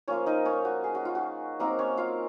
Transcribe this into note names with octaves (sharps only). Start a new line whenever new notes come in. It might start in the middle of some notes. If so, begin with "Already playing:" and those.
F3 A#3 C#4 F4 C#5
D#4 D#5
C#4 C#5
F#4
G#4
F#4
F4
F#4
F#3 A#3 C4 D#4 A#4
C#4 C#5
F4 F5